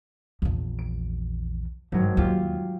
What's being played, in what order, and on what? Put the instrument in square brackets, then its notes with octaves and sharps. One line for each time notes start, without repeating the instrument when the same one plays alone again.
[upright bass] A#1 E2
[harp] D7
[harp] G#1 F#3 [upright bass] G2
[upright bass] D#2 [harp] F4 G4